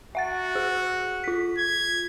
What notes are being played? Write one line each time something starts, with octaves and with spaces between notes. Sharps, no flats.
F#4 E5 F#5 A6
G#4
F4 B6
G#6